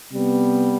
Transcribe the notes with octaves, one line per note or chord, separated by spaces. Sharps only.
C3 G3 B3